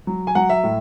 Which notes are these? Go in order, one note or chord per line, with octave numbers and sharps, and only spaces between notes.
F#3
G#5
F#3 F#5
E5
A2